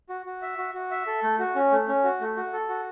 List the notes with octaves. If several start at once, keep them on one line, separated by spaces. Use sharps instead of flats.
F#4
F#4
E5
F#4
F#4
E5
A4
A3
F#4
C#4
A3
C#4
F#4
A3
F#4
A4
F#4